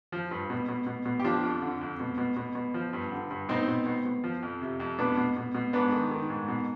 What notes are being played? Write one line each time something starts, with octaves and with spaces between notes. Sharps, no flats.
F3
G2
B2
B2
B2
B2
G4
F3 D4 F4
F2
D3
F2
B2
B2
B2
B2
F3
G2
D3
G2
B2 C4 D#4
B2
B2
B2
F3
F2
C3
F2
B2 B3 D4
B2
B2
B2
G#2 B3 D4
D#3
D#3
G#2
B2